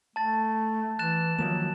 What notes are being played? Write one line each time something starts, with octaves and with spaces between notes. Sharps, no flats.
A3 A5 A6
E3 F#6 A6 E7
D#3 F3 F#3 A#3 E7